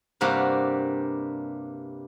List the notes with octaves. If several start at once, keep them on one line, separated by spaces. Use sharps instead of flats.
G2 C3 G3 A#3 D4 F#4